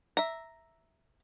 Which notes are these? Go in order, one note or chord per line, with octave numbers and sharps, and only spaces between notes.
E5 A#5